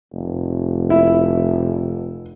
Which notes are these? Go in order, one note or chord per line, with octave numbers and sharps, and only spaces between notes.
F1
E4